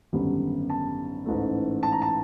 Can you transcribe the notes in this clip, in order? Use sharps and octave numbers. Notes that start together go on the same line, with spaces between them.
G#1 F#2 D3 G3 B3
A5
A1 G#2 E3 A3
A5
A#5
A5